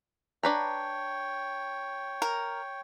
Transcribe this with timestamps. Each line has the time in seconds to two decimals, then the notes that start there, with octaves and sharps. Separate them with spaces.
0.43 D4 B4 C#5 G5 A#5
2.22 A#4